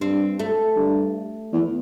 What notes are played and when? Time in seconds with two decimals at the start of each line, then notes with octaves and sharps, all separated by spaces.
0.01 G2 C4
0.39 A3
0.76 G2
1.53 E2